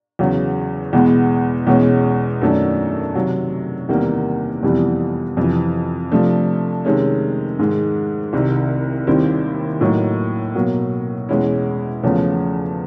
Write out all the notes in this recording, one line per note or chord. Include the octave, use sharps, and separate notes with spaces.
E2 C#3 F#3
E2 B2 G#3 B3
E2 B2 G#3 C#4
F#2 D#3 F#3 A3 D4
C3 D#3 F#3
E2 C3 D#3 G3 A#3
F2 C3 E3 G3 B3
F2 C3 E3
C3 F3 A3 D4
C3 D#3 G#3 C#4
G#2 D#3 G#3
C2 C3 D#3
D#2 D#3 G3 C4 E4
A2 F#3 A#3 D#4
B2 F#3 A#3
E2 B2 G#3 C#4 E4
E2 C#3 F3 A3 C#4